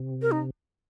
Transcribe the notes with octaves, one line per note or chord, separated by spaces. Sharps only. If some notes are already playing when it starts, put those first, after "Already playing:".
Already playing: C3
A#4
D#4